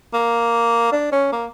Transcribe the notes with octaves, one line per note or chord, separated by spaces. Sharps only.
A#3
D4
C#4
A#3